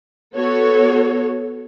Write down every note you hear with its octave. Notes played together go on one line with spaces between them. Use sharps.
B3 F#4 A4 C#5